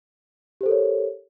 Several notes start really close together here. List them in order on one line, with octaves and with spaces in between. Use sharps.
G4 C5 A4 A#4 C#5